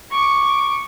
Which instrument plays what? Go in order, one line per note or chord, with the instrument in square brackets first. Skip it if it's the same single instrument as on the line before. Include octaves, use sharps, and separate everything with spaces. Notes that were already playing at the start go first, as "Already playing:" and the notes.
[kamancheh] C#6 D6